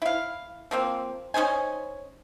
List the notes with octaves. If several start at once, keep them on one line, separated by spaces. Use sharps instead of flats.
E4 F5
F3 A#3 C4
C#4 D#4 C5 G#5